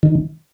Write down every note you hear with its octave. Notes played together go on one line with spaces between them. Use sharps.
D#3